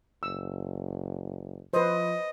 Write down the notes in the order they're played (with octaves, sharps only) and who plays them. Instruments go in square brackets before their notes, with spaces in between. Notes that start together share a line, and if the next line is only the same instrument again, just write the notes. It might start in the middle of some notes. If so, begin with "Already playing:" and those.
[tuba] F#1 [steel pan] E6
[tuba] F3 [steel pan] B4 C5 [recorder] D#5